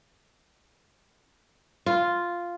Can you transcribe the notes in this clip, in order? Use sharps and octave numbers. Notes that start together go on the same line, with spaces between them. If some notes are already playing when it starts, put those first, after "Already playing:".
F4